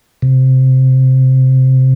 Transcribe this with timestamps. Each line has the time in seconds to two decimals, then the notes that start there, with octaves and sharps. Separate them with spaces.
0.22 C3